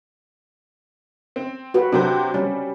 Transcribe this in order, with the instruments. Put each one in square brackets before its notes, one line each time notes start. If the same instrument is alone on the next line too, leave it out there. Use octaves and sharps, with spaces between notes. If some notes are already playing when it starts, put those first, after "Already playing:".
[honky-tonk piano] C4
[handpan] F#4 B4
[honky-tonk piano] C3 F#3 C5 [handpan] C4 D4
[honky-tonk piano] G3 [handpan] C#4